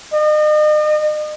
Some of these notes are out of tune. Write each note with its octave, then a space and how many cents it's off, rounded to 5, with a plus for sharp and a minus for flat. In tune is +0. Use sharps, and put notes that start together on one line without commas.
D#5 -40